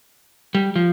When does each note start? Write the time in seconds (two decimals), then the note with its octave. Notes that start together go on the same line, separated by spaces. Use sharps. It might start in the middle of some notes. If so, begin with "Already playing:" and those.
0.55 G3
0.76 F3